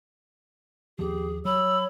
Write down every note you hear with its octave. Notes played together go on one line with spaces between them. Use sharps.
D#2 F3 G4 G#4
F#3 C#5 B5 E6